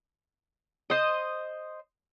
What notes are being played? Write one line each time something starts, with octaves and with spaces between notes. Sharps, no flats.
C5 D#5